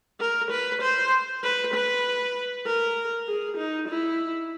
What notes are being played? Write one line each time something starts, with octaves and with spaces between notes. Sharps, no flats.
A#4
B4
C5
B4
B4
A#4
G#4
D#4
E4